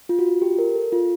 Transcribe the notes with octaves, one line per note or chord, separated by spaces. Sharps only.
F4
F#4
F4
G4
A#4
A4
F4